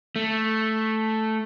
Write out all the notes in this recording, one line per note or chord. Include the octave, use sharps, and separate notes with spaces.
A3